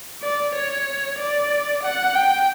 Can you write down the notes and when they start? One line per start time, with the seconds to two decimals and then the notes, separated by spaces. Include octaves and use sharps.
0.22 D5
0.55 C#5
1.19 D5
1.83 F#5
2.15 G5